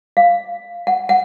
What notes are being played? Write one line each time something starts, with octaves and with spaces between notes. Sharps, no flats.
F5
F#5
F#5